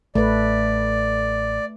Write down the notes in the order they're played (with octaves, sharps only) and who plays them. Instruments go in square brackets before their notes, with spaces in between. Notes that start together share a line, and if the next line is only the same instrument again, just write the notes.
[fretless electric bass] A1 [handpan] A3 B4 [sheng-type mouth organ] D5